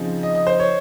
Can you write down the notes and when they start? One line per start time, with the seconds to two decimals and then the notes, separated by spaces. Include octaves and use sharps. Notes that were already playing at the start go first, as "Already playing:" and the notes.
Already playing: C#3 F3 C4 D#4 G#4
0.23 D#5
0.35 D#5
0.47 C5
0.60 C#5